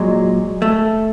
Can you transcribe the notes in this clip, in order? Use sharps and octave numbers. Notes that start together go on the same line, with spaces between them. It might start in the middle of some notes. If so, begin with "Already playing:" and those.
Already playing: A#2 F#3 G#3
A3